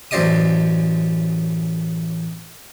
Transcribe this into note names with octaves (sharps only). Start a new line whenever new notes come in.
A1 F#2 C5 D5 D#5 D#6